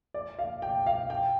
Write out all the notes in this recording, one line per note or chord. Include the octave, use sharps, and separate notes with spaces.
D5
F5
G5
F5
G5